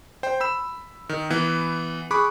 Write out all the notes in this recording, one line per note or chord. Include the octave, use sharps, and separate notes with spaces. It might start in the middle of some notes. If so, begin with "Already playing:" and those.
C5 G5
B5 E6 E7
D#3
E3 B3
G#4 B5 C#6 D6 F#6